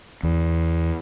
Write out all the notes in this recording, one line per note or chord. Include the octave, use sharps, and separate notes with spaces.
E2